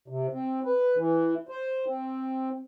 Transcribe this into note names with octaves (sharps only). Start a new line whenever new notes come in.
C3
C4
B4
E3
C5
C4